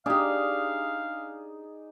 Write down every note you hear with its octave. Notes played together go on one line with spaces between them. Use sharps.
D4 D#4 G4 G#4 D5 F5